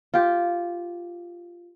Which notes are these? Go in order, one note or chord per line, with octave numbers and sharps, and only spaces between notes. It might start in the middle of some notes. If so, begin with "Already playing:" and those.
F4 G4